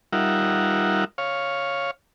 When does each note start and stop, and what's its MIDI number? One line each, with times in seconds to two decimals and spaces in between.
0.13 1.04 55
0.13 1.04 63
0.13 1.04 65
0.13 1.04 70
0.13 1.04 76
0.13 1.04 78
1.18 1.91 73
1.18 1.91 77